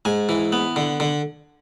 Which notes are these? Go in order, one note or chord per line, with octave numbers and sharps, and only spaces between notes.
G#2 G#5
E3
B3
D3
D3